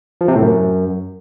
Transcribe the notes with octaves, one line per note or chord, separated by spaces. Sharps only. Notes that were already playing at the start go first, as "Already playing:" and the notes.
F3
C3
A2
F#2